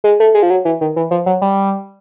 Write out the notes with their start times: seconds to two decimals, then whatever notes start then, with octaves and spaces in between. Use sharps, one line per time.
0.04 G#3
0.20 A3
0.34 G#3
0.43 F3
0.50 F#3
0.65 E3
0.81 D#3
0.96 E3
1.11 F3
1.26 F#3
1.42 G3